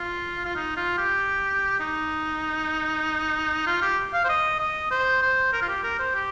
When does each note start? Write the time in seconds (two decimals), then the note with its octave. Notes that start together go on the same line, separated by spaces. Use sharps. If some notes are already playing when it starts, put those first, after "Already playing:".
Already playing: F4
0.45 F4
0.56 D#4
0.77 F4
0.98 G4
1.80 D#4
3.67 F4
3.82 G4
4.13 F5
4.25 C5
4.29 D#5
4.59 D#5
4.91 C5
5.22 C5
5.53 A#4
5.62 F4
5.69 G4
5.84 A#4
5.99 C5
6.15 G4